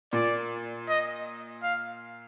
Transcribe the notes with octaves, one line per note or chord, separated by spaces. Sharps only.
A#2 D5
D#5
F5